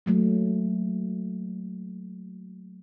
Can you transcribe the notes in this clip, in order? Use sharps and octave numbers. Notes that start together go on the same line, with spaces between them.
F#3 A3 A#3